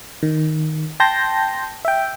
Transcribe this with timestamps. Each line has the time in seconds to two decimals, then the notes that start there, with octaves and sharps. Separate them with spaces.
0.23 D#3
1.00 G5 A5 C6 G6 A#6
1.85 E5 G5